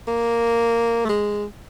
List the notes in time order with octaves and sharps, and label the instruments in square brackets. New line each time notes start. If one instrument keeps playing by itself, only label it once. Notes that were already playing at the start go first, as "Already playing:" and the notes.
[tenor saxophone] A#3
A3
G#3